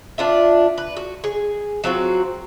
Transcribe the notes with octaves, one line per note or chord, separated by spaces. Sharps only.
D4 F4 E5
B4
F#4
G#4
F#3 C4 F4 F#4